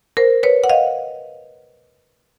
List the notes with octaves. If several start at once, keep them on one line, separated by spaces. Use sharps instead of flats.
A#4 C5
B4 C#5
F#5
D#5 F5